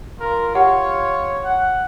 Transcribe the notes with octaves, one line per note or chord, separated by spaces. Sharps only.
F4 A#4
G4 C#5 F#5
F#5